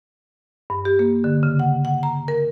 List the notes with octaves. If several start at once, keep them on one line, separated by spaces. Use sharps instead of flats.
G2
G4
A#3
D3
C#3
F#5
F#5
A#5
A#4